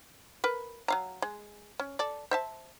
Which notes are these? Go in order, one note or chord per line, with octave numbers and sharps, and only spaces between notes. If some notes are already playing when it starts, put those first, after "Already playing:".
A#4 B4
F#3 F5 A#5
G#3
C#4
A4 D5
C5 E5 A5